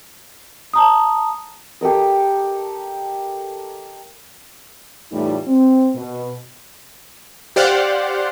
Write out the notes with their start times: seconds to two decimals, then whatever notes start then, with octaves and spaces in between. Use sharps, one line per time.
0.74 A5 A#5 D#6
1.81 G4 A4 A#4 D#5
5.12 E2 A2 G3 A3 D#4 F4
5.47 C4
5.95 B2
7.56 G4 C5 D5 F5 F#5